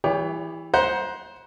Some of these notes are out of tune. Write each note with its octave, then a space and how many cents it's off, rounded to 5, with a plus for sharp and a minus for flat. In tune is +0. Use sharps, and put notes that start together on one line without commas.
E3 +0 G4 +30 C#5 +45
C5 +0 F#5 +0 A#5 +35